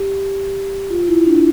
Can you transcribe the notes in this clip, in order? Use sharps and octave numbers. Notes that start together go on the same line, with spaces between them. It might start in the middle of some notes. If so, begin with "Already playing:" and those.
Already playing: G4
F4
E4
D4